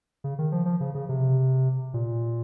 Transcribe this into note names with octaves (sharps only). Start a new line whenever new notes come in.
C#3
D#3
F3
F3
C#3
C#3
C3
A#2